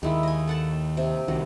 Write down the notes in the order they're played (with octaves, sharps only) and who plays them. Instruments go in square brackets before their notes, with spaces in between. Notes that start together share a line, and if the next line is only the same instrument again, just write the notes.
[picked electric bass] D#2 D#3 [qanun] G#3 E4
[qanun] D#5 G#5
A4 F#5 A5
C3
[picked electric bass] C2 D#3 [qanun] F#4